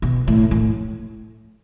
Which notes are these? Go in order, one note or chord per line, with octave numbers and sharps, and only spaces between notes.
B2
A2
A2